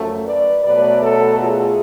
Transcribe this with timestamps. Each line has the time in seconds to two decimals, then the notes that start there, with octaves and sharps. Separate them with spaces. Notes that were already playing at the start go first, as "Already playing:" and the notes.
Already playing: F#2 F3 A3
0.26 B4 D5
0.64 B2 F#3 A3 B4 D5
1.01 A4 C#5
1.39 F4 G#4